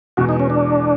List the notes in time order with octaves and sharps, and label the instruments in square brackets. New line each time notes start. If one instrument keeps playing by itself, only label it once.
[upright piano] E2 B2 G#3 [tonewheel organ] F#4
[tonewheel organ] D#4
C#4
D4